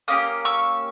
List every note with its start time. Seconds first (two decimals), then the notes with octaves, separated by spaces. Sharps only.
0.08 A#3 C#4 G4 D#6
0.45 C#6 E6